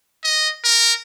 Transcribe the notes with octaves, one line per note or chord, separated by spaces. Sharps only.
D#5
A#4